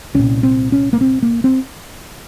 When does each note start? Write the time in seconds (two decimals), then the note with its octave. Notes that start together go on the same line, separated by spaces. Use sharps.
0.14 C2 A#2 C#4
0.43 C4
0.72 C#4
0.93 A#3
1.01 C4
1.22 A#3
1.44 C4